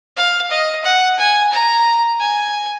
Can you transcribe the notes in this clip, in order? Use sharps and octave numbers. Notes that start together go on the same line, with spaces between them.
F5
D#5
F#5
G#5
A#5
G#5